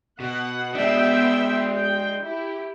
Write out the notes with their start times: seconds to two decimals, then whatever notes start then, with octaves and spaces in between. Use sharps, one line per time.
0.20 B2 F#5
0.75 G#3 B3 D4 E5 G5
1.77 G5
2.23 E4 G4